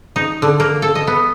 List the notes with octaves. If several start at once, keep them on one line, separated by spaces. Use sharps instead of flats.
D#4
D3
A#3
A4
D#5
B3